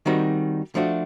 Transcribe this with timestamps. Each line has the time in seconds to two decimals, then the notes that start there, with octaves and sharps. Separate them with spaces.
0.06 D#3 G3 C4 D#4 F#4
0.75 F3 A3 D4 F#4